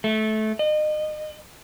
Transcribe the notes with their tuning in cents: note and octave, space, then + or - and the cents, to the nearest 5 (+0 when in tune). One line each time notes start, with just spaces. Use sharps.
A3 -20
D#5 -30